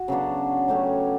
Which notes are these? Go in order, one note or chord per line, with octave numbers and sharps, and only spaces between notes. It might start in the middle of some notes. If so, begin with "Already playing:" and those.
Already playing: F#4
C#3 F#3 B3 D4
F#3 A3 C#4 G4